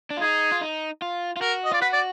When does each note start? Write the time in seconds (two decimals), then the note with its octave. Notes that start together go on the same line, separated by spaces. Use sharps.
0.10 D4
0.17 F4
0.21 D#4 G#4
0.52 F4
0.61 D#4
1.02 F4
1.37 F4
1.41 F#4 A#4
1.65 D#5
1.72 F4 D5
1.81 F#4 B4
1.93 D5